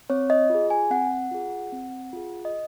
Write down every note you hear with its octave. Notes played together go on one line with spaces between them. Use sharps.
C4 C#5
D#5
F4 G#4
G#5
C4 F#5
F4 G#4
C4
F4 G#4
D#5